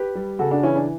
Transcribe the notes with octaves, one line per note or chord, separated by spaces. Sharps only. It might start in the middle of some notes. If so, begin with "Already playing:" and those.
Already playing: G4 B4
G3
C#3 F#4 A4
D4 F#4
E3 C#4 E4
D4